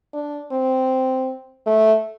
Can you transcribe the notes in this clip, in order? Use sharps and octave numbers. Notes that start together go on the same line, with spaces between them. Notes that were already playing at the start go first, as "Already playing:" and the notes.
D4
C4
A3